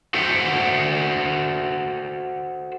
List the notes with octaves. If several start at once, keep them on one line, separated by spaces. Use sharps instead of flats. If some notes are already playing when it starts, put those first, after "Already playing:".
F#4 A4 C5 E5 F#5 G5